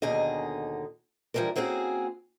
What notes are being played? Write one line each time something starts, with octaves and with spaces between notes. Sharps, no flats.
D#2 B2 D3 D#4 G#4 D#5
E3 F3 G3 G#3 D4 A#4
A#3 C4 C#4 F#4 G#4